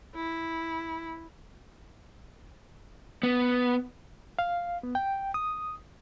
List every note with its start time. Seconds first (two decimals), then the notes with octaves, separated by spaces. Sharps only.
0.15 E4
3.23 B3
4.39 F5
4.83 B3
4.95 G5
5.34 D#6